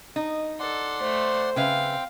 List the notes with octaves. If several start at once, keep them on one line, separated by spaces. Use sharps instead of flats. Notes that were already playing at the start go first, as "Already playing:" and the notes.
D#4
A4 D5 F#5 C6
A3 C5
C#3 C4 B4 E5 F5 G5